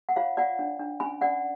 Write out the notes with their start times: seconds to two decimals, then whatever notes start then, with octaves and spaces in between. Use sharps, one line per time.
0.09 F#5
0.16 F4 C#5 F5
0.37 F4 D5 F#5
0.59 D4
0.80 D4
1.00 C#4 G#5 B5
1.21 C#4 D5 F#5